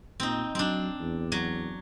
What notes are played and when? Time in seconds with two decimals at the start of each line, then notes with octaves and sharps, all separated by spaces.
0.20 A#2 C4 D#4
0.55 F#3 C4 D4
1.00 E2
1.32 F#3